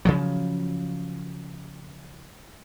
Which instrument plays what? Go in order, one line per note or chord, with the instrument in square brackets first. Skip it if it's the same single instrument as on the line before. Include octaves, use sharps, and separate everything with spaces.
[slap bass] C#3 F3 F#3